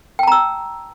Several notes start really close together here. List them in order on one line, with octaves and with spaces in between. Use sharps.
G5 A5 A#5 E6